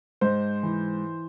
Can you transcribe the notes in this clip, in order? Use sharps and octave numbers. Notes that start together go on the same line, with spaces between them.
G#2 C5
E3